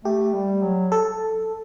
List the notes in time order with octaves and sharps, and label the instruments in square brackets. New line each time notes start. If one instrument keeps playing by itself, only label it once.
[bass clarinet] A3 [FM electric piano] G4
[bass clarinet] G3
F#3
[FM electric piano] A4